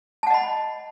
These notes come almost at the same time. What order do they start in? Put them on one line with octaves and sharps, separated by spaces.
A5 F#5 D#5 B5